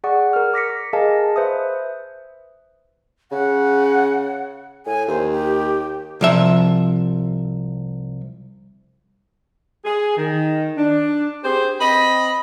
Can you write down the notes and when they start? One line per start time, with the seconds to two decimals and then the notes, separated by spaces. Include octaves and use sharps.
0.04 G#4 D5 F#5 C#6
0.33 A#4 F6
0.54 D6 A#6 B6 C#7
0.93 G#4 A#4 D#5 F5 G#5 A5
1.36 B4 C5 E5 D#6
3.32 C#3 F#5
4.86 A2 G#5
5.08 D#2 C5
5.32 G4
6.21 C2 F3 E5
9.85 G#4
10.17 D#3
10.77 D4
11.44 G4 G#4 C5
11.81 C4 D#5 B5